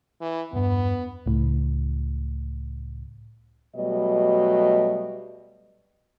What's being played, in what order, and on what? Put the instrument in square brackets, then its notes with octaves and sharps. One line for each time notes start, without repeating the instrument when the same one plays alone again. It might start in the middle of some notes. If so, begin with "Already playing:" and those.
[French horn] E3
[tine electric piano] E2 G2 [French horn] B3
[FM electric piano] C#2 A2
[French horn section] B2 F#3 G3 A3 D#5